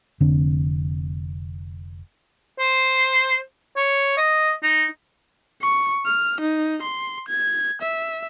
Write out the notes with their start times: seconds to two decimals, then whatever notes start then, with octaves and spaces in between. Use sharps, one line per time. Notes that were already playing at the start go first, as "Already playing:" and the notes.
0.20 F1 D3 C4 D4
2.59 C5
3.77 C#5
4.18 D#5
4.63 D#4
5.62 C#6
6.06 F6
6.41 D#4
6.82 C6
7.29 G#6
7.82 E5